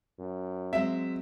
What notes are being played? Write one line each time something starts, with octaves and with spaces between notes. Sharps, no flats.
F#2
F#3 G#3 C4 E5